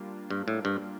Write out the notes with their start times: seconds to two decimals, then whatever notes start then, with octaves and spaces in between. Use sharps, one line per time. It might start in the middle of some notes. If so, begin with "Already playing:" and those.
Already playing: G3 A#3 D4 F4
0.30 G2
0.48 A2
0.65 G2